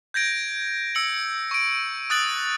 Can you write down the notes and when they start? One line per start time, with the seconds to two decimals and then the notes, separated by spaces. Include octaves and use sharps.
0.14 G6 G#6 A#6 D7
0.95 E6 C#7 F#7
1.51 C#6 D7
2.10 D#6 F#6 A6 D7 F#7